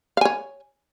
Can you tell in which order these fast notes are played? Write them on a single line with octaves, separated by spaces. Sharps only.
F5 G#5 C#5